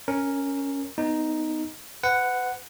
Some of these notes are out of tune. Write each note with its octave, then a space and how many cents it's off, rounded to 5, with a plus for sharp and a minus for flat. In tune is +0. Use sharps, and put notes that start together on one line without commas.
C#4 +0 A#4 +0
B3 +20 D#4 +0
B4 +35 F#5 +0